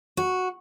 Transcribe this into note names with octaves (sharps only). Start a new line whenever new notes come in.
F#4